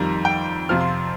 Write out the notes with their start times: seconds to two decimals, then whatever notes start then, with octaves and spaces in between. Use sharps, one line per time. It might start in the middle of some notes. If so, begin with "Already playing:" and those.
Already playing: F2 D#3 G3 A#5
0.25 G5
0.69 F2 C3 F3 F6
0.81 C6